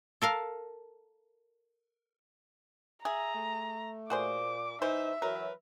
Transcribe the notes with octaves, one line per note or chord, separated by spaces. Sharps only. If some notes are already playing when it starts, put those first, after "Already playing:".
A4 A#4 F5
G#4 E5 A#5
A3
A#2 F#4 G#4 C5 D6
E3 D#4 C5 E5
E3 F#3 A#4 B4